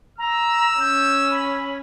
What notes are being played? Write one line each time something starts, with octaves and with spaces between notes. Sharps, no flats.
A#5 E6
C#4 G6
B5